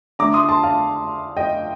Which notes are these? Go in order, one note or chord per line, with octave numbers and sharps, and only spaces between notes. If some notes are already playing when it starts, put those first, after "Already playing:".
D3 A3 A#5 D6
C6 D#6
A5 C6
F5 A5
D#5 G5